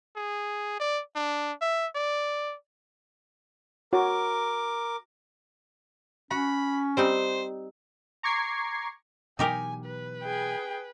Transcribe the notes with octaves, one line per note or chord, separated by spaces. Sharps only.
G#4
D5
D4
E5
D5
F#4 A#4 C#5 D6
C#4 F#4 B5
G3 C4 D#4 C5
A#5 C#6 D6 G#6 C7
B2 E3 F#3 D#4 G4 A#4 G#5
B4
G#4 G5